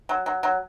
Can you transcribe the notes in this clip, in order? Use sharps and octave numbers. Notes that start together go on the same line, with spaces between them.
F#3
F#3
F#3